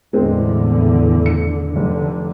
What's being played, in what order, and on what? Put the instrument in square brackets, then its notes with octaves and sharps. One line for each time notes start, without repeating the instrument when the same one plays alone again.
[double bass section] E2 A2 D3 [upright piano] G#3 C4
[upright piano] C#7
[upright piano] F1 [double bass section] D3